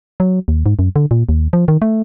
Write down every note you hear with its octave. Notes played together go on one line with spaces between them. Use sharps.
F#3
D#2
G#2
F#2
D3
A#2
D#2
F3
D#3
A3